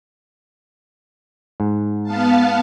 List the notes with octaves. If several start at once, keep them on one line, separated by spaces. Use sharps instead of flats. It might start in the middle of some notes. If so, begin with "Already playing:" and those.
G#2
B3 F5 A5